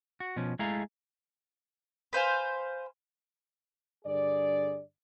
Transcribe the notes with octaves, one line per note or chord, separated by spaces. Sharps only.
F#4
B2 F3 C#4
G#3 A3 E4 G#4 F5 A#5
B4 C5 F5 G#5
G2 D3 G#4 D5